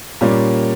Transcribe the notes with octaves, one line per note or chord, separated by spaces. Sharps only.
A#2 G3 A#3 C#4